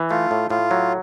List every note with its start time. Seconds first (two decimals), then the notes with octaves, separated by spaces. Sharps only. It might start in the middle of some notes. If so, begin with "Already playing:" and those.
Already playing: E3
0.10 A3 F4
0.31 A2
0.50 A2 F4
0.71 F#3